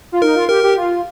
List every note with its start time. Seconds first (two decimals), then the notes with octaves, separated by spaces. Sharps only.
0.12 F4
0.22 D#4 A#4
0.35 F4
0.49 G4 A#4
0.63 G4
0.76 F4